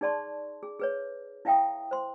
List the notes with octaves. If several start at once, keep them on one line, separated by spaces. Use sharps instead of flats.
D#4 G#4 D5 A5 C6 C#6
G#4
G#4 B4 C#5
E4 E5 F5 G5 A#5 D#6
C5 C6